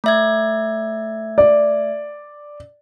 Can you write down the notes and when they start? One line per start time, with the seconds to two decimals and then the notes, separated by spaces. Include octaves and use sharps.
0.04 A3 E5 G#6
1.38 D5